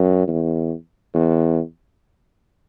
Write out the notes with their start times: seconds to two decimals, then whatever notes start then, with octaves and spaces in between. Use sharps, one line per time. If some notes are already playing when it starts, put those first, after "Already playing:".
Already playing: F#2
0.28 E2
1.15 E2